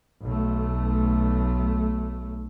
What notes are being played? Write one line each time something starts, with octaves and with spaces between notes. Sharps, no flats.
B1 A3